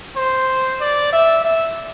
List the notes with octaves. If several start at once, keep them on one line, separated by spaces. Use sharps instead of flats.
C5
D5
E5
E5